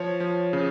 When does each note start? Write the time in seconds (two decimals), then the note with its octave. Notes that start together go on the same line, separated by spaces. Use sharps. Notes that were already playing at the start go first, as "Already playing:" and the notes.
Already playing: F3 C#5
0.20 F3
0.53 C#3